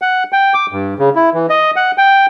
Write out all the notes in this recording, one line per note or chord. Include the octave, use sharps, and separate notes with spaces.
F#5
G5
D6
G2
C#3
E4
E3
D#5
F#5
G5